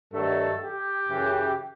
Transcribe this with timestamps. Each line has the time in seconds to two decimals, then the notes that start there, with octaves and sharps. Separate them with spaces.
0.13 G2 D#3 F#3 A3 A4
0.61 G4
1.09 F#2 C#3 E3